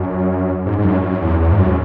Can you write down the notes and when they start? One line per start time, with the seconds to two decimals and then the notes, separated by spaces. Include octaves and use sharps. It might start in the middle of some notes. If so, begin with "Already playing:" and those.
Already playing: F#2
0.66 G#2
0.78 G#2
0.84 F#2
1.02 F#2
1.21 E2
1.40 E2
1.52 G#2
1.59 F#2